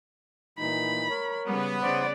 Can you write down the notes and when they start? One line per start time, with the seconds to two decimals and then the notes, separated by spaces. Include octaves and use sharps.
0.59 A#2 E3 D#4 B5
1.10 A#4 C#5
1.46 C#3 G3 B3
1.82 C#3 C5 D5 F#5